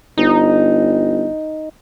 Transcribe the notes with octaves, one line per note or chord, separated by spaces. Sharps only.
G1 D#4